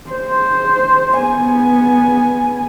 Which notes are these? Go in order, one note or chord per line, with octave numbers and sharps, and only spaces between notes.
C5
B3 G#5